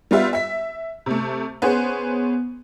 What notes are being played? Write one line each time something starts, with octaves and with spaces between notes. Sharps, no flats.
G3 B3 F4 E5
E5 B6
C3 A3
B3 C#4 G#4 C5